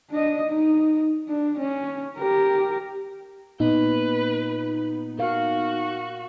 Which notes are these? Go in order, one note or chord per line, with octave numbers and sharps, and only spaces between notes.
D4 D#5
D#4
D4
C#4
G4 A#4
A#2 B3 D#4 B4
F#4 A#4 F5